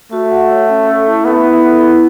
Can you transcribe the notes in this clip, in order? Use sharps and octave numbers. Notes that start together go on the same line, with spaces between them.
A3 F#4
F#5
C#5
C#4
A4
E4
B3 E5
E4
A4
E4